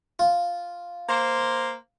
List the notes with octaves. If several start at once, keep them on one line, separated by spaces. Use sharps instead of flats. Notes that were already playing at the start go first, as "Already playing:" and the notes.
F4
A#3 C5